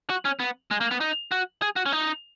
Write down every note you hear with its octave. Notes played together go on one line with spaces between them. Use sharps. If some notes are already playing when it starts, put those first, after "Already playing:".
F#4
C#4
B3
G#3
A#3
B3
D#4
F#4
G#4
F#4
C#4
D#4